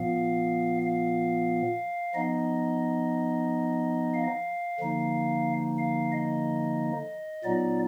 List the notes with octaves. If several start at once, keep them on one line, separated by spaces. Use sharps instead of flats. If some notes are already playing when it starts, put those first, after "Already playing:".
Already playing: A#2 F3 B3 F5
F5
F3 B3 D#4 D#5
F5
D3 F3 A#3 D#4
F5
D#5
A#2 F#3 B3 D#4 D5